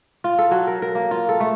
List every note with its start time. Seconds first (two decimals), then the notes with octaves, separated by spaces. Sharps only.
0.24 F4
0.39 A4
0.51 F#3
0.67 A#4
0.82 A#4
0.95 A#3
1.11 F4
1.29 A4
1.40 A3